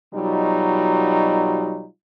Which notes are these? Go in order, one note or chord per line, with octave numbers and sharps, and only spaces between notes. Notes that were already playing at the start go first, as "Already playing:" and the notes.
B2 F#3 G3 D#4 F4